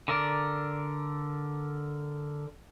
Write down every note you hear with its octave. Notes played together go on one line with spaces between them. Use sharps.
D3 A#4 D5